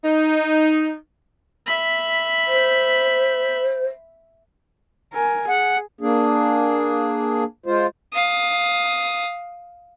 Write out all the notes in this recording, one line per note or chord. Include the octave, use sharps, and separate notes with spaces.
D#4
E5 B5
C5
A#4 G#5
G#4 F#5
A#3 D4 G#4
G#3 F4 C5
F5 D#6